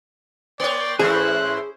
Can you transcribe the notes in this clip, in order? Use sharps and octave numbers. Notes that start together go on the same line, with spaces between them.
A#3 C#5 D5 G5 C6
G#2 E3 A3 C#4 E4 G#4 C5 F#6